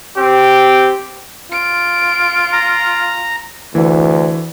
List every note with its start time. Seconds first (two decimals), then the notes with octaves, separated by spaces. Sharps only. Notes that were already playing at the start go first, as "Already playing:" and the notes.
0.18 C4 G4
1.52 F4 D7
2.53 A#5
3.75 D2 E3